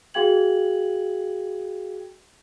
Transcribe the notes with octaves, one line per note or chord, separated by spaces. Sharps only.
F#4 G#4 F5 G5 G#6 F#7